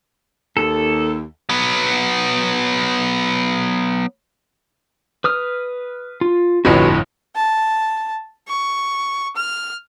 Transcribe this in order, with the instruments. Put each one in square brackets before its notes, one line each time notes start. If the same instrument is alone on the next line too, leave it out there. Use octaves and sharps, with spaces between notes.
[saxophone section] D#2 [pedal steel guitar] A4
[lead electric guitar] F#3 B3
[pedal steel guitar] B4 D#6 F6
F4
[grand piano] G1 F2 A2 [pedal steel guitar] F#4 B4 C#5
[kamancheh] A5
C#6
F6